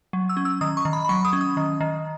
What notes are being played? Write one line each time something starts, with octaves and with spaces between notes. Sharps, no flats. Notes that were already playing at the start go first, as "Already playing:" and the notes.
F#3
E6
C#4
E6
D#3 D#6
C#6
D#3
B5
B5
F#3 C#6
D#6
C#4
D#6
D#3
D#3